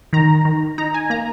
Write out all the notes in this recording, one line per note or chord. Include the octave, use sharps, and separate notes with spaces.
D#3 A#5
D#3
D#4 A#5
G#5
A#3 A#5